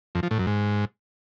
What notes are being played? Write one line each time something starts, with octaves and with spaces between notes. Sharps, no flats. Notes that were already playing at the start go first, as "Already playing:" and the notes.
F2
F3
A2
F#2
G#2